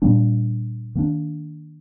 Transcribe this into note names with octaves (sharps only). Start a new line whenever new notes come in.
A#2 G3 A#3 D4
D#3 A#3 D4